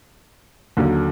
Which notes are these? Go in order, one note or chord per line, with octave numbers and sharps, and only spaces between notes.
D#2 D3 F#3